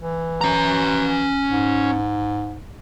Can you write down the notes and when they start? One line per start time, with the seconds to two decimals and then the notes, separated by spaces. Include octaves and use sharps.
0.01 E3
0.41 C#4 A#5
1.50 G#2